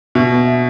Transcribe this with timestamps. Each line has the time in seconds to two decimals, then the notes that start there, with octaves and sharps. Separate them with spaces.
0.15 B2 E5
0.32 B3
0.47 E5